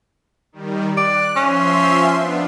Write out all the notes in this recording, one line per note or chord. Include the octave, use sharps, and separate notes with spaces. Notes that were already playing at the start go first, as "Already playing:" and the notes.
D#3 G3
D5 F#6
F3 C#4 E5 C6
B3 D4 F4